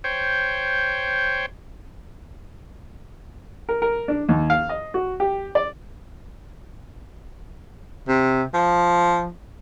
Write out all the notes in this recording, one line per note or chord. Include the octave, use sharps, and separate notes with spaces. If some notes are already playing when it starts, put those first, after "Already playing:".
C5 C#5 G5
A#4
A#4
D4
D#2
F5
D#5
F#4
G4
D5
C3
F3